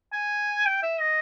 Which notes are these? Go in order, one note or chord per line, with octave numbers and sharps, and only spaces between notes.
G#5
G5
E5
D#5